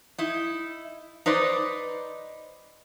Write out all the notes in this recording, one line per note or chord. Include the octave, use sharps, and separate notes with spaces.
D#4 E4
D#4 B4 C5 D5